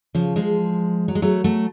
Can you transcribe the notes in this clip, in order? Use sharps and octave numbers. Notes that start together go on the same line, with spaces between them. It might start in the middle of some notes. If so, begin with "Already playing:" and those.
C#3 F3
F3 G#3
F#3
G#3
F#3 A3
F#3 A3